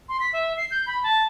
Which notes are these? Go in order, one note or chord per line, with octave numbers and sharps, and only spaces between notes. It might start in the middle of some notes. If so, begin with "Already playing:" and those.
C6
B6
E5
C7
G6
B5
A5